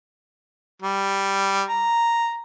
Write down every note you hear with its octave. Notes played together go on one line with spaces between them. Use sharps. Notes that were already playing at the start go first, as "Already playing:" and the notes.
G3
A#5